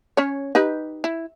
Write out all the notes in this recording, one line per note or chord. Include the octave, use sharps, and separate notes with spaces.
C#4 C#5
D#4 G4 B4
E4